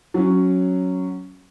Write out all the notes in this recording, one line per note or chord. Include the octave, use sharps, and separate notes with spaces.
F#3 C#4